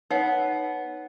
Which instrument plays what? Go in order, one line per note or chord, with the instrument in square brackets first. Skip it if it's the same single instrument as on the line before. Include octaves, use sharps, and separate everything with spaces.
[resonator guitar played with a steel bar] B3 [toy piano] D#4 C#5 F#5